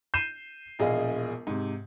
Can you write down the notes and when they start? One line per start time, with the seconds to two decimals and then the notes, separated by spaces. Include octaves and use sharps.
0.14 G6 C7 D#7 E7
0.79 E1 A#1 G#4 D#5 F5
1.47 G#2 C3